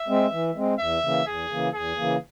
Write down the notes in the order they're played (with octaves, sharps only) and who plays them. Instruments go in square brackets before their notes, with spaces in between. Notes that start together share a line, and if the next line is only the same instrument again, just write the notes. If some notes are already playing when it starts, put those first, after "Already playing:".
Already playing: [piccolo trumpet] E5
[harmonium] G#3 C4
E3
G#3 C4
[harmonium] E2 [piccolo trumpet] E5
[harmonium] C#3 E3 A#3
[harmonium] E2 [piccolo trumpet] G#4
[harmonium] C#3 E3 A#3
[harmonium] E2 [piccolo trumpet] G#4
[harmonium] C#3 E3 A#3